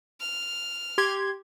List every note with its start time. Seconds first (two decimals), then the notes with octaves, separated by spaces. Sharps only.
0.21 F6
0.98 G4 C6 G#6